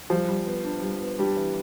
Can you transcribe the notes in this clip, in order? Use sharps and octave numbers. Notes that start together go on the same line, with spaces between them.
F3 G3
G3
B3
D4
G3
B3
G3 D4
E3